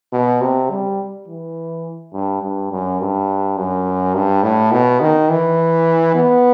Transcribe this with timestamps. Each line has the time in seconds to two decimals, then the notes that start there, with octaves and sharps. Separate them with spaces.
0.13 B2
0.41 C3
0.70 G3
1.28 E3
2.13 G2
2.42 G2
2.71 F#2
3.00 G2
3.57 F#2
4.15 G2
4.43 A2
4.72 B2
5.01 D#3
5.29 E3
6.15 B3